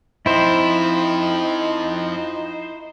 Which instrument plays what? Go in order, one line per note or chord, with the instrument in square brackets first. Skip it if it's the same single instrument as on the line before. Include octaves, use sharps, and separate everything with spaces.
[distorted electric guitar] F3 C4 [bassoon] D#4 [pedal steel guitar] E4 C5